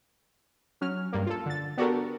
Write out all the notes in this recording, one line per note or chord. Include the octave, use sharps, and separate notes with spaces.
F#3 C#4 F6
G2 A#3
F4 A4
D3 A6
B3 D4 F#4 G4 A4 A#4